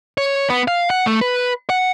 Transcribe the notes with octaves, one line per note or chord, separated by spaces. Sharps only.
C#5
B3
F5
F#5
A3
B4
F#5